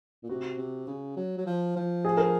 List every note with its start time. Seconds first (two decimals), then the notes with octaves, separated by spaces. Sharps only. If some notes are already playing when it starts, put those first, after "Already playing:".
0.23 A#2
0.29 C3 F#4
0.58 C3
0.87 C#3
1.17 F#3
1.38 F#3
1.46 F3
1.76 F3
2.05 G#4
2.17 A#4